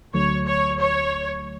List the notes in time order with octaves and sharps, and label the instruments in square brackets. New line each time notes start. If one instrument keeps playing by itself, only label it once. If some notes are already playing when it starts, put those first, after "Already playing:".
[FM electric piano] D2 D3 F#3 A3 [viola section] C#5
[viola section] C#5
C#5